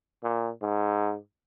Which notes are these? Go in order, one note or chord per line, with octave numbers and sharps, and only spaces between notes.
A#2
G#2